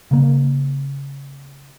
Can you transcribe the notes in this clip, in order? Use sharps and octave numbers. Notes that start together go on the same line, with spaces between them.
C#3 A#3